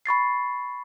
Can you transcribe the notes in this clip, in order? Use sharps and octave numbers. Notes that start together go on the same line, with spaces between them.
B5 C#6 A6 C7